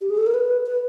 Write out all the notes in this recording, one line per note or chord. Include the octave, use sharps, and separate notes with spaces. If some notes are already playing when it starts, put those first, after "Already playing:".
G4
G#4
A4
A#4
B4
B4